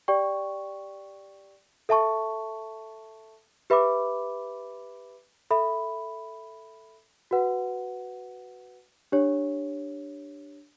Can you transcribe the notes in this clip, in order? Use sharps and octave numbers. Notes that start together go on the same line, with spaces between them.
G4 D5 G5 C#6
A4 E5 A5 C#6
G4 B4 E5 B5 D6
A4 E5 B5
F#4 B4 F#5
D4 G4 C#5